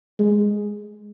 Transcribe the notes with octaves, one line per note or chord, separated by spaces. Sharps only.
G#3